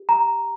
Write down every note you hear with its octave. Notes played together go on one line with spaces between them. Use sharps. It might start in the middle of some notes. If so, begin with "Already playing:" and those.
Already playing: G4
A#5